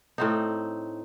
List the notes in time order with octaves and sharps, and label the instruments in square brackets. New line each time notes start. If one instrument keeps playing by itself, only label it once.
[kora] A2 C4 D#4